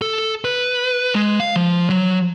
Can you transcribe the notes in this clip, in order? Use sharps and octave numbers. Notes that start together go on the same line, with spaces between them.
A4
B4
G#3
F5
F3
F#3